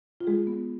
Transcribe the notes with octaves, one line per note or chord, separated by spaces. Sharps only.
F4
G#3 G#4
B3